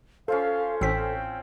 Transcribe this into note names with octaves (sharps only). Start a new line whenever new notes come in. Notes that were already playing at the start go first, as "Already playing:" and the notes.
C#4 F4 A4 C5 F5
A1 A2 C4 C#4 G5 B6